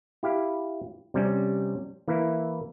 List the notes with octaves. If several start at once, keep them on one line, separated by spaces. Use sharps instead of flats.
E4 G4 F5
C3 G3 C#4
E3 A#3 E4